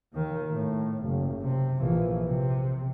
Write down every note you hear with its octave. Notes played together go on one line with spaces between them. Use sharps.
D#2 D#3
A2
F#1
C3
A#1 E3
C3